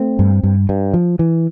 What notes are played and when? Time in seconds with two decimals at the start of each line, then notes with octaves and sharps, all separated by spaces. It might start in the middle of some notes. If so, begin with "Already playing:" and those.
Already playing: A3 C4
0.19 G2
0.43 G2
0.69 G2
0.94 F3
1.19 E3